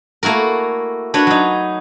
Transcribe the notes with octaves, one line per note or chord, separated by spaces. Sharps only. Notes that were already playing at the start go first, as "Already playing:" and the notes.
A3 A#3 E4 F#4 A#4
D4 F#4 B4 C#5
F#3 D#4